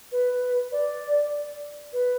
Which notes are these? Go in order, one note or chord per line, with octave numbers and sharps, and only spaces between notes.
B4
D5
B4